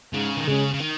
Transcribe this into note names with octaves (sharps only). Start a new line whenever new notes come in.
G#2 C#3
D#3
C#3 G#3 C#4
C#3
D#3